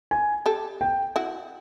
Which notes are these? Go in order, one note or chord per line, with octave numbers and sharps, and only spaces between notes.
G#5
G4 A4
G5
E4 F#4